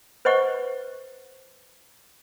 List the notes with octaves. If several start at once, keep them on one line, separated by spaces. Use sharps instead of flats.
B4 C5 D#5 F#5 C#6